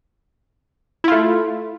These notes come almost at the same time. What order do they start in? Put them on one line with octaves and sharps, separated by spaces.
E4 F4 A3